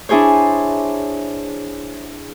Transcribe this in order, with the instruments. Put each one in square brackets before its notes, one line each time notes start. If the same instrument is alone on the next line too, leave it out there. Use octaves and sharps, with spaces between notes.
[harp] D4 E4 G#4 C5 C#5